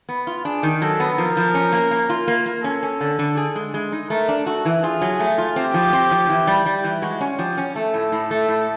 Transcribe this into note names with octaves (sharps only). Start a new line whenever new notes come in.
B3
F4
D4 G#4
D#3
F#3 A4
B3
F3 A#4
F3
C#4
A#3
A#3
F4
A#3
A#3
C#4 A4
C#4
D3
D3
G#4
G#3
G#3
D#4
A3 A#4
D4
F#4 A4
E3
F4 G#4
F#3
A3
F4
C4 G4
F3
C4
F3
E3
G3
G3
E3
G#3 F#4
C#4
F3 G4
C#4
A3 A4
A2
A2
A3
A2